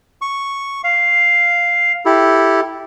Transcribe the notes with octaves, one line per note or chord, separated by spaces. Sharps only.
C#6
F5
E4 G4 A4